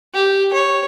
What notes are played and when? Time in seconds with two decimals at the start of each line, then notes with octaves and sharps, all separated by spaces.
0.14 G4
0.53 C#5